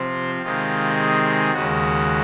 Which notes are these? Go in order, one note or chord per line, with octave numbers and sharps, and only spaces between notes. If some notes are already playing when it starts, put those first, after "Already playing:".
Already playing: C3 F3 C4 C5
C3 D#3 G#3 C4 F4
G#4
D#2 C#3 G#3 F#4